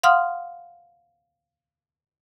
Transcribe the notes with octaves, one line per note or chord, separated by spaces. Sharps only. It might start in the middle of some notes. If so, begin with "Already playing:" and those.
F5 F#5 C6 D#6 F6